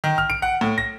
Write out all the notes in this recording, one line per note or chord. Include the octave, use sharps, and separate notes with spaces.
D#3
F6
D7
F#5
A2
A#6